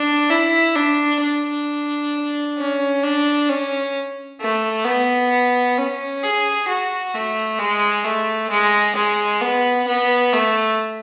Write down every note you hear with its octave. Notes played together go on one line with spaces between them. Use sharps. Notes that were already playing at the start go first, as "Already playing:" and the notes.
Already playing: D4
E4
D4
D4
C#4
D4
C#4
A3
B3
C#4
G#4
F#4
A3
G#3
A3
G#3
G#3
B3
B3
A3